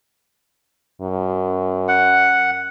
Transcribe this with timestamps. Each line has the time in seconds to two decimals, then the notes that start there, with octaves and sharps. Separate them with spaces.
1.01 F#2
1.88 F#5